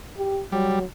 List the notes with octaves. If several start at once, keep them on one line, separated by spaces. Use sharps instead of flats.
G4
F#3 G3